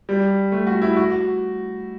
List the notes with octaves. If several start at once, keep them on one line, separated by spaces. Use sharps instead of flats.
G3
A3
F#4
E4
F#4